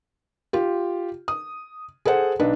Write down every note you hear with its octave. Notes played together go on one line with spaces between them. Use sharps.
F4 G4
D#6
G#4 A4 C5 F#5
B1 D4 D#4 B4